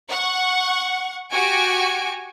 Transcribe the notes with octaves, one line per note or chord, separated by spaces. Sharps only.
F#5 C#6
F#4 G4 G#5 C#6 D7